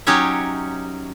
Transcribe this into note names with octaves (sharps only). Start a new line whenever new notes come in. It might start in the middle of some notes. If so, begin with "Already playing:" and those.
F#3 C#4 D#4 G4 C#5 E5